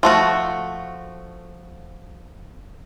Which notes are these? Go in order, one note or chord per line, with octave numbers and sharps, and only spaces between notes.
F3 A3 F#4